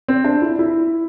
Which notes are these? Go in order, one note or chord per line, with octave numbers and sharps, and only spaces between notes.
C4
D4
E4
E4